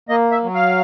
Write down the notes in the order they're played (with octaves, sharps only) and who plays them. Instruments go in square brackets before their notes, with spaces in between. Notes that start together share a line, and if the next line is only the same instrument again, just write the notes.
[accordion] A#3 D#5
E5
F#3
F5